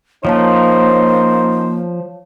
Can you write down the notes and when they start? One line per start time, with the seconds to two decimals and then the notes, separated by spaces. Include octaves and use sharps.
0.25 F3 A#3 C#4 D#4 C5 C#5 F5 A5